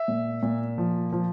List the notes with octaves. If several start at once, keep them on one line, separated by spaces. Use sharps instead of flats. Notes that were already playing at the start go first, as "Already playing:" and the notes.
Already playing: E5
A#2
A#2
F3
F3